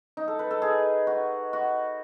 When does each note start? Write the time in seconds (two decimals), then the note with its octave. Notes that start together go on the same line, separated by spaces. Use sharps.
0.17 D#4
0.28 A4
0.39 B4
0.51 A4
0.62 G#4
1.07 F#4
1.53 F#4